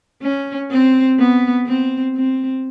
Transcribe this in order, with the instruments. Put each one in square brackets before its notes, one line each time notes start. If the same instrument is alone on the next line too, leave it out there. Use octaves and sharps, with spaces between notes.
[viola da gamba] C#4
C4
B3
C4
C4